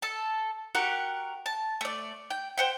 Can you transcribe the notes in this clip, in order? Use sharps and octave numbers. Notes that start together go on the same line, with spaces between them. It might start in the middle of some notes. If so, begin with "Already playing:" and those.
A4 A5
F#4 G4 A#4 F#5
A5
A3 D5
G5
C5 F#5 G5